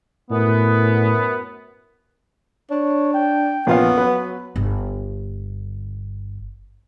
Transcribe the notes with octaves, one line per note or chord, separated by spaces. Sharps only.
F#2 A2 B3
D4 C#5
G5
A#1 B3 C#4 F4 F5
F#3 B4
G1 D3